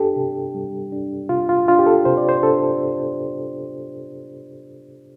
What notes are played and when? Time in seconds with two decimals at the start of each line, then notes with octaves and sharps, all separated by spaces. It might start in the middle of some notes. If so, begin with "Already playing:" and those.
Already playing: D4 G4 A4
0.16 C3
0.55 G3
0.92 D4
1.29 C3 F4
1.49 F4
1.68 D4 F4
1.79 G4
1.87 A4
2.05 C3 C5
2.17 D5
2.29 C5
2.43 D4 A4